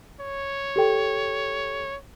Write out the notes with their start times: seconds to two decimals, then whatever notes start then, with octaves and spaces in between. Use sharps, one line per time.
0.21 C#5
0.76 G4 A4 G5